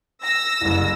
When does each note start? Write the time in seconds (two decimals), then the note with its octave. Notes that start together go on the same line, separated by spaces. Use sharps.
0.23 E6 A#6
0.61 F#1 C2